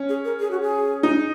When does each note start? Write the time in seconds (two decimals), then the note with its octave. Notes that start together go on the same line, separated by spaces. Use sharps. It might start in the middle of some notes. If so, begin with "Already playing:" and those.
Already playing: C#4
0.09 G#4
0.25 A#4
0.40 G#4
0.51 F#4
0.61 G#4
1.03 D#4